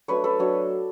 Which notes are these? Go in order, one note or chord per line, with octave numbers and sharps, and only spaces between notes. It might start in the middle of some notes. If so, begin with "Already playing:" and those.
F#3 A3 D4 B4 C#5
A4 B4
F#3 A3 D4 C#5